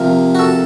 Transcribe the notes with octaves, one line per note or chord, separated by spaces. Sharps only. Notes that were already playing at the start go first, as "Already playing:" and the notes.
Already playing: C3 F3 A#3
F#4
A4